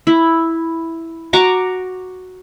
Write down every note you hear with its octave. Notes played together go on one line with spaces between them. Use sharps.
E4
F#4 A#5 C#6 D6